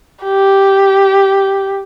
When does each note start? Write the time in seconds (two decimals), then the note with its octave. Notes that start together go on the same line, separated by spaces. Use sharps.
0.24 G4